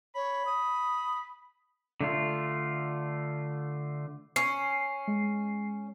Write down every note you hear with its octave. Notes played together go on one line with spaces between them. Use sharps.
C#5 B5
D#6
D3 A3 F4
C#4 C7
G#3